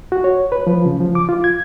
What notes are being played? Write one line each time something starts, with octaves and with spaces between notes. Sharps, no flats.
F#4
C#5
B4
F3
C#3
F3
D6
F4
G#6